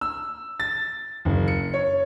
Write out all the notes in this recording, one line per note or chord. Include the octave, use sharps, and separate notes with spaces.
E6
A6
F#1
C#7
C#5